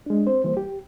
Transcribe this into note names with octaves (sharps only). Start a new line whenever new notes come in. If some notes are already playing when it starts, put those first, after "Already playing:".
G#3 D4
C4 C5
E3 G3 A#3 C5
G4